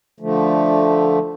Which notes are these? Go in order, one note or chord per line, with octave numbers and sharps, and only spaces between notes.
D3 F3 A3